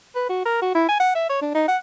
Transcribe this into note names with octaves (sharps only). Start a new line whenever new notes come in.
B4
F#4
A#4
F#4
E4
G#5
F#5
E5
C#5
D4
D#4
F#5